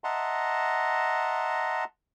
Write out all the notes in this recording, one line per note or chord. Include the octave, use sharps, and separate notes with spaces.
D#5 E5 F#5 A5 A#5 C6